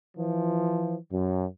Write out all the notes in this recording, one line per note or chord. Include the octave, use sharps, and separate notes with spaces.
E3 F3
F#2